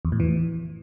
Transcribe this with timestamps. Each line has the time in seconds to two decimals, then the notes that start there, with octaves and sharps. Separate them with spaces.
0.05 E2
0.12 A2
0.20 E3